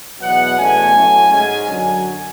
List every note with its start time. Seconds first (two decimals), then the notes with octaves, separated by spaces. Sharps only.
0.21 E2 B2 F#3 B3 F#5
0.57 E2 B2 A3 C#4 G#5
0.94 A2 F#3 A3 C#4
1.31 G#2 G#3 C#4 G#5
1.68 F#2 D3 F#3 G#5